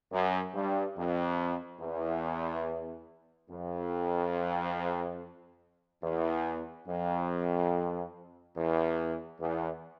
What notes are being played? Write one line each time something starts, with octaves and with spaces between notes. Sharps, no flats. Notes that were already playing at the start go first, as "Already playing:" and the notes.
F#2
G2
F2
E2
F2
E2
F2
E2
E2